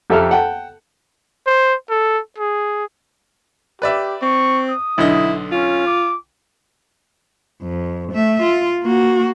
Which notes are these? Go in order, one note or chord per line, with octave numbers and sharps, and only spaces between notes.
F2 G4 A4 E5 A#5 F6
F#5 G5 A5
C5
A4
G#4
G4 B4 D5 E5
C4 C#6
D#6
B1 D3 E4 D#5
C#4 F4
D6
F2
A3 E5
F4
A#3 F#4